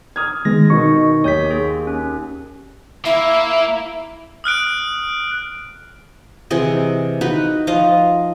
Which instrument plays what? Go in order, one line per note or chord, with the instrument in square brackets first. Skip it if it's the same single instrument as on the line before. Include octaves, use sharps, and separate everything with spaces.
[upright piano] D#6 F6 G#6
[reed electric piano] D#3 G#3 B3 [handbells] A#6
[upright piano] B2 D#3 D#4 [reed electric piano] C#6
[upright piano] D#2 [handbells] C#5 G6 B6
[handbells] A#3 G#4
C#4
[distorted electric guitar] A#3 [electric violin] E4 [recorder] E5
[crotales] D#6 F6 F#6 D7
[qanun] C3 E3 G#4 D#5
D#4 F#4 B4
F3 F4 D#5 F5